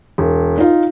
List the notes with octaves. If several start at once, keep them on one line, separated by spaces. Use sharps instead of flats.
E1
D#4 F4